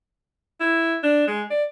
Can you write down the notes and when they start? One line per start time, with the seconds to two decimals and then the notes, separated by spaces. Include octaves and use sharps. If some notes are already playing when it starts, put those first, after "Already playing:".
0.60 E4
1.03 D4
1.27 G#3
1.51 D5